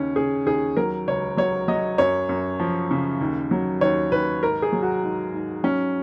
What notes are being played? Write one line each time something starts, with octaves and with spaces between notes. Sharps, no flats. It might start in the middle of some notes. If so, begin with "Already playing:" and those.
Already playing: D#2 C#3 C#4
C#3 G#4
D#2 G#4
F#3 A#4
C#2 C#5
F#3 C#5
F#3 D#5
F#2 C#5
F#2
F3
C#3
D#2
F#3
D#2 C#5
D#2 B4
G#2 A#4
G#4
F#3
F#4
G#2
G#2
F#3 C#4